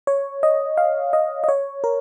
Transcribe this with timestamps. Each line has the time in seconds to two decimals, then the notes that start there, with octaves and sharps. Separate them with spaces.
0.07 C#5
0.43 D#5
0.77 F5
1.13 D#5
1.44 D#5
1.48 C#5
1.84 A#4